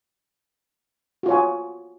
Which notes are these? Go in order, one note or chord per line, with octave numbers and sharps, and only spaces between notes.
F4 F#4 C#5 G#5